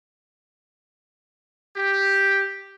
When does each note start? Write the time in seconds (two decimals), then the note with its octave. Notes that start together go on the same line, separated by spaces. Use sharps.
1.75 G4